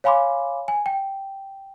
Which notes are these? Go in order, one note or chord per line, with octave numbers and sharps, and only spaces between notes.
C#5 F5 G#5 B5 C6 D6
G#5
G5